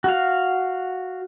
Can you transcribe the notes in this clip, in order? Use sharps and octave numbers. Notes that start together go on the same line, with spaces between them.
F#4 F5